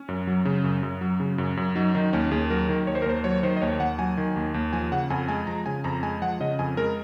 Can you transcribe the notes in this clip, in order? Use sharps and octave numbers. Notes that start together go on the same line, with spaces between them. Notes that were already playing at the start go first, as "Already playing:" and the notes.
Already playing: C#4
F#2
F#3
C#3
F#2
F#2
F#3
C#3
F#2
F#2
F#3 D#4
D#3 D#4
D#2 C#4
D#2 G#4
F#3 A#4
D#3
D#2 C#5
C5
A#4
D#2 C5
F#3 C#5
D#3 C5
D#5
D#2 C#5
D#2 F#5
F#3 G#5
D#3
D#2
D#2
F3 G#5
C#3 F#5
F2 G#5
G#3 G#5
F3 A#5
C#3 G#5
F2 A#5
G#3 G#5
F3 F#5
C#3 D#5
F2 G#5
G#3 A#4